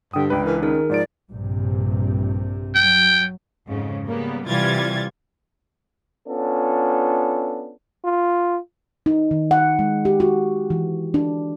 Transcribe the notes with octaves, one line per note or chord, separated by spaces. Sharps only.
G2 D3 G5 D#6
C#2 D4 B4 G5
E3 A#4
D#3 C#4 D#4 G#4 A#4
G#2 F3 D5 D7
A#1 G2 C3
F#3 G5
F2 G#2 C#3
C#3 G3 A#3 B3
C3 E3 G3 F4 G#6 A6
B3 C#4 D4 F4 A4
F4
D#4
D#3
F#5
G#3
G4
F#4
E3
D4